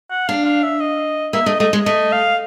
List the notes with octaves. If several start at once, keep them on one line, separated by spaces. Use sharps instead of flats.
F#5
D4 F5
F5
E5
D#5
A#3 E5
A3 D#5
A3 D#5
G#3
A3 D#5
F5